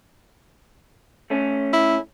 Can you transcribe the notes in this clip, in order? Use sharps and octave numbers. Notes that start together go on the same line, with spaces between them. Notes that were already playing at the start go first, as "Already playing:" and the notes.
A3 C#4
E4